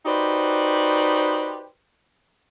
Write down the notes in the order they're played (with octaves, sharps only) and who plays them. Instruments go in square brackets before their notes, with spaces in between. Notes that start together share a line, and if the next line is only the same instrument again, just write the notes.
[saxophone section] D#4 F#4 G4 B4 C5 D5